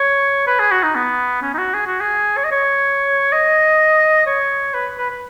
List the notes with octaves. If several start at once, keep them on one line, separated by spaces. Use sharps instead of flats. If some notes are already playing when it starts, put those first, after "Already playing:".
Already playing: C#5
B4
G#4
F#4
D#4
B3
C#4
D#4
F#4
G#4
F#4
G#4
C#5
D#5
C#5
D#5
C#5
B4
B4
B4